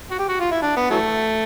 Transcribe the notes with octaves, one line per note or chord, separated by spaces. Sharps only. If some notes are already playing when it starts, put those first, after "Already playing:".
F#4
G4
F#4
F4
E4
D4
B3
E3 F#3 A3